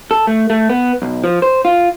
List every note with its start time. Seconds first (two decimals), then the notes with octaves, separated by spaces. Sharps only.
0.11 A4
0.27 A3
0.50 A3
0.69 B3
1.02 B1
1.24 F3
1.42 C5
1.65 F4